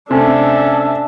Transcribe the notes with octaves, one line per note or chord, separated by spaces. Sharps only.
C3 A3 C#4 D4 A4 E5